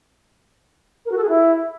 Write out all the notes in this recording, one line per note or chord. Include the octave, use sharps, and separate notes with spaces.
A#4
F#4
A4
G#4
E4